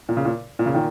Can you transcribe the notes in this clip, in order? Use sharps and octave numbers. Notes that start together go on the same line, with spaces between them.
A#2
C#3
A#2
A#2
C#3
A#2 D#3